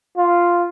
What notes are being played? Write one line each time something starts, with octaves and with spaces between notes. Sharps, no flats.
F4